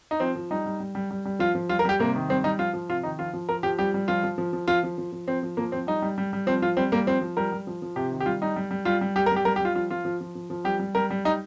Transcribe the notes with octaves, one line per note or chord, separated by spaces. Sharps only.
D#4
F3 C4
F3
G3 D#4
G3
G3
G3
G3
G3
F3 F4
F3
G3 F4
A#4
G3 G4
C3 A#3
D#3
G3 C4
G3 D#4
F3 F4
F3
C3 F4
D#3 D#4
F3 F4
F3
F3 A#4
F3 G4
G3 G4
G3
F3 F4
F3
F3
F3
F3 F4
F3
F3
F3
F3 C4
F3
F3 A#3
F3 C4
G3 D#4
G3
G3
G3
F3 C4
F3 F4
G3 C4
G3 A#3
F3 C4
F3
G3 A#4
G3
F3
F3
C3 G4
D#3
G4
G3 F4
G3 D#4
G3
G3
G3 F4
G3
G3 G4
A#4
G3
G4
G3 A#4
G4
G3 F4
F3 F4
F3 F4
F3
F3
F3
F3
G3 G4
G3
G3 A#4
G3
G3 D#4